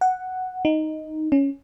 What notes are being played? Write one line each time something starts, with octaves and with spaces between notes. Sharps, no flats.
F#5
D#4
C#4